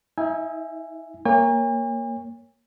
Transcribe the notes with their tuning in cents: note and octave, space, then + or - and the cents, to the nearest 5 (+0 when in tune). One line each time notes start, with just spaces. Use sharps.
D#4 +45 E5 +15 G#5 -5
A#3 +0 C#5 +0 G#5 -45